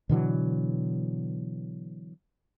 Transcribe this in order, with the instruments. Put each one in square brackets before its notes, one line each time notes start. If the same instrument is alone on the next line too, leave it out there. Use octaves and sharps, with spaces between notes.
[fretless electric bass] B2 D3 E3 F#3